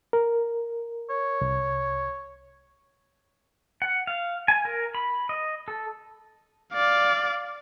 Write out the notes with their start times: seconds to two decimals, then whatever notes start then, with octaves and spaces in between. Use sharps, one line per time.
0.13 A#4
1.10 C#5
1.41 C2
3.82 F#5
4.07 F5
4.48 G#5
4.65 A#4
4.95 B5
5.29 D#5
5.68 A4
6.74 D5 F5